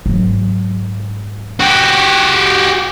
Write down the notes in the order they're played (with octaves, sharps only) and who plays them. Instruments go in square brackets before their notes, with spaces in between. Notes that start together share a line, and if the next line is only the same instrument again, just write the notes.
[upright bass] G#2 F#3
[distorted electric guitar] F#4 G4